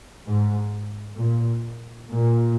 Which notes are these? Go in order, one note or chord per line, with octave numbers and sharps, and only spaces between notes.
G#2
A#2
A#2